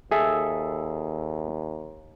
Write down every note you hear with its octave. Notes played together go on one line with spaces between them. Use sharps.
D#2 G#4 A4 E5